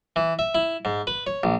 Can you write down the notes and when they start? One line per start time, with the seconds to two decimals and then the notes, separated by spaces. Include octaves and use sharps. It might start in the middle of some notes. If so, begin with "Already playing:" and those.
0.16 E3
0.39 E5
0.55 E4
0.85 G#2
1.07 B4
1.27 C#5
1.43 A#1